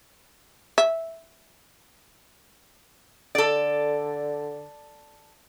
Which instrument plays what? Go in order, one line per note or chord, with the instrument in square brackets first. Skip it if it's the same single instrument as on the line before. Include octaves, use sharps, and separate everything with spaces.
[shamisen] E5
[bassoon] D3 [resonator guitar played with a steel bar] A4 D5